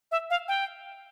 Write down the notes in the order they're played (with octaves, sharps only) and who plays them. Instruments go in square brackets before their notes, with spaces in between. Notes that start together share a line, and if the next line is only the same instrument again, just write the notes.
[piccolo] E5
F5
G5